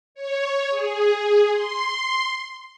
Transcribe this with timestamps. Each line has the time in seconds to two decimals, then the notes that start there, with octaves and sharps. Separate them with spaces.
0.15 C#5
0.70 G#4
1.52 C6